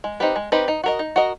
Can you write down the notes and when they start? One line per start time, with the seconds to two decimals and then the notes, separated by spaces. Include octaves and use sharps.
0.04 G#3
0.20 C4 D#4 G4 B4
0.36 G#3
0.52 C4 D#4 G4 B4
0.68 D#4
0.84 F#4 A#4 D#5
0.99 D#4
1.16 F#4 A#4 D#5